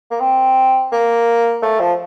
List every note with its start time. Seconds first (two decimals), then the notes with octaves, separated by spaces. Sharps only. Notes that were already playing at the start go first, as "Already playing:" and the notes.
0.11 A#3
0.20 C4
0.92 A#3
1.62 A3
1.80 F3